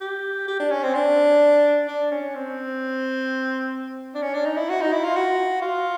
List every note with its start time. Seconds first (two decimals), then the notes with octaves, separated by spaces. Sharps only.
0.01 G4
0.48 G4
0.60 D4
0.71 C#4
0.83 C4
0.95 D4
1.88 D4
2.11 C#4
2.35 C4
4.15 D4
4.22 C#4
4.34 D4
4.45 D#4
4.57 E4
4.69 F#4
4.81 D#4
4.92 E4
5.04 F4
5.16 F#4
5.62 F4